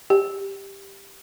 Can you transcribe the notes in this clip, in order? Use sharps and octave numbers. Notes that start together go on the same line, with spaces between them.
G4